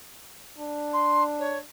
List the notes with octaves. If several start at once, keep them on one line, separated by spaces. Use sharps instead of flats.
D4
C6
C#5